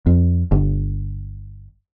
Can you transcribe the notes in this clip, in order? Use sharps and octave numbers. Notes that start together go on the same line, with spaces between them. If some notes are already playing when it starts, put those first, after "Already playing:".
F2
G1